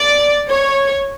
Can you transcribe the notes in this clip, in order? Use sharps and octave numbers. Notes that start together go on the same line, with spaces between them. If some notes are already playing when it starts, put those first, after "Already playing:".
Already playing: D5
C#5